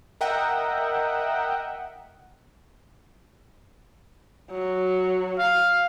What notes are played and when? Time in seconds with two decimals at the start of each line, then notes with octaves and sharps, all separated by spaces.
0.21 A#4 D#5 E5 F#5 G5
4.52 F#3
5.38 F5